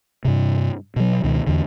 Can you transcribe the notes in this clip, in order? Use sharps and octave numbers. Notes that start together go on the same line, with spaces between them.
G2 C3
B2 F#3
C#2 B2 D#3
E2 D3